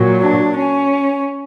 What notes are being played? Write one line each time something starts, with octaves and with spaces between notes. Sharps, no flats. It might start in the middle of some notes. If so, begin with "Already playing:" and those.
Already playing: A#2 F#3
D4
C#4